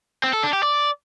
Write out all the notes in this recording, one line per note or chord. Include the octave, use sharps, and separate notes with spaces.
C4
A4
D4
G4
D5